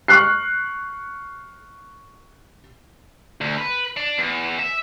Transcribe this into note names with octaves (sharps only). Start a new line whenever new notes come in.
C#6 F6 F#6 C7
D2
B4
D4
E2
E5